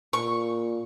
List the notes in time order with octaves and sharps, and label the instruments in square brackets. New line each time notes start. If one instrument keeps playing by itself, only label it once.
[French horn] A#2 [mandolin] C#6